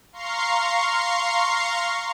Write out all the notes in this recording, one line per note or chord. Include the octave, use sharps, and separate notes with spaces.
F5 A#5 C6 C#6 C7